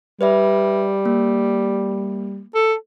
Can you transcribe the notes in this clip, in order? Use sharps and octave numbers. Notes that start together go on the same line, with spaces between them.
G3 B4 D5 E5
A#3
A4